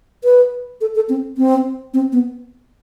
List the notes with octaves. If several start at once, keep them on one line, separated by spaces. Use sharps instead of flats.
B4
A4
A4
C4
C4
C4
B3